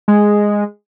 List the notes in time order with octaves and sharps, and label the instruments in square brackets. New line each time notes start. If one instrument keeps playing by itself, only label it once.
[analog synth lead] G#3